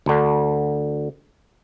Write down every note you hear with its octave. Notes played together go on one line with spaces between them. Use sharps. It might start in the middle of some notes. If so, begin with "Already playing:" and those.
D2 D3